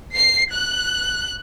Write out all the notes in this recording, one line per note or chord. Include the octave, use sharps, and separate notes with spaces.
C7
F#6